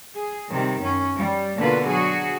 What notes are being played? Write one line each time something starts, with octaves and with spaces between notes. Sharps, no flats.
G#4
C3 D#3 G3
F#2 C#4
G3
B2 D3 A#3 F4 B4
F#3 F#4 G#4